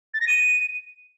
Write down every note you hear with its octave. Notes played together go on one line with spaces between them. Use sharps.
A6
A#6
D#7